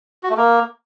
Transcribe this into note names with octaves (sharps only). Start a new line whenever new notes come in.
F#4
A3
A#3